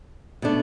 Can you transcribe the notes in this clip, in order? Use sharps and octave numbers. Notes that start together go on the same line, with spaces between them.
B2 A3 D4